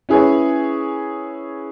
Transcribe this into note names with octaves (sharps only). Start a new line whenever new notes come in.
C#4 E4 G#4 B4 C#5